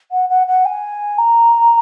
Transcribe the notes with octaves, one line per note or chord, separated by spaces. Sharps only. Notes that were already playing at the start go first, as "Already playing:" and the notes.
F#5
F#5
F#5
G#5
A#5